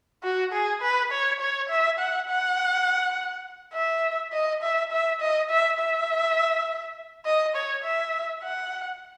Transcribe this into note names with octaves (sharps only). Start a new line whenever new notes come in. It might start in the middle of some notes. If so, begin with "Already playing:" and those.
F#4
G#4
B4
C#5
C#5
E5
F#5
F#5
E5
D#5
E5
E5
D#5
E5
E5
D#5
C#5
E5
F#5